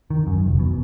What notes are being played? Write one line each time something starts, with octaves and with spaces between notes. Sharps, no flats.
D#3
F#2
F1
B2